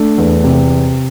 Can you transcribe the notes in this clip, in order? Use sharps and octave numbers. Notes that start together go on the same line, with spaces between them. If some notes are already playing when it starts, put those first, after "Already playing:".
Already playing: A3 D4
E2
C3